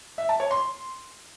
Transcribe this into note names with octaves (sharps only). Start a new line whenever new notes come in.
E5
A5
C#5
C6